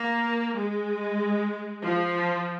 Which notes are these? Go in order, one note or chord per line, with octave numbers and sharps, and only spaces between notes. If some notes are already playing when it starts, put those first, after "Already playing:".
Already playing: A#3
G#3
F3